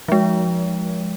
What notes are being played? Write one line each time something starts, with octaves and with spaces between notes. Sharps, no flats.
F3 G#3